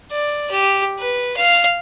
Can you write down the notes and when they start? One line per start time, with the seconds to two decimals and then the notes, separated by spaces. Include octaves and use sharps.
0.11 D5
0.51 G4
0.99 B4
1.37 F5